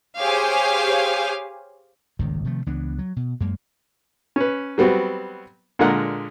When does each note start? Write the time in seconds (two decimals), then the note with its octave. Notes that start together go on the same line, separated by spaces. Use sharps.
0.20 G4 G#4 C5 C#5 F5 G#5
2.19 D#1 G#1 C#2 D#3
2.45 C3 D#3 F3 A3
2.66 C#2 E3 B3 D4
2.98 F#3
3.16 B2
3.40 F#2 G#3 A#3
4.36 C#4 B4
4.78 F#3 G3 B3 C4 F#4
5.79 A#2 D3 G#3 A#4 F#5